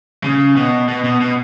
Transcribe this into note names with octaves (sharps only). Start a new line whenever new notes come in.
C#3
B2
B2
B2
B2